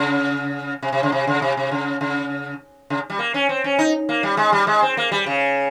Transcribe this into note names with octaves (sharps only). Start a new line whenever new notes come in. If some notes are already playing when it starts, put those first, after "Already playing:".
Already playing: C#3
C3
C3
C#3
C3
C#3
C3
C3
C#3
C#3
C#3
G3
A#3
C#4
C4
C#4
D#4
A#3
G3
G#3
G3
G#3
C4
A#3
G3
C#3